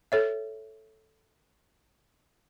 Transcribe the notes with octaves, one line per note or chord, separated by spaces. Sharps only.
A4 C#5 E5